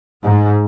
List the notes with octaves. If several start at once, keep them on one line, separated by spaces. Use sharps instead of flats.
G#2